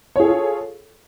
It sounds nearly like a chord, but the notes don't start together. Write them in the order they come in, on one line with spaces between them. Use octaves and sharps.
C#5 G#4 A4 F4